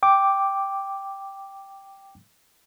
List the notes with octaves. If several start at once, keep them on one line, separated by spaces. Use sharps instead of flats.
G5 D6